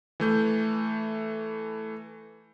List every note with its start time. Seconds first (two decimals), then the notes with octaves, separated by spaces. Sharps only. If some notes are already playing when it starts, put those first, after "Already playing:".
0.20 E3 A3 G6